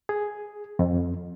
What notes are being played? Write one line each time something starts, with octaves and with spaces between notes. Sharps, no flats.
G#4
F2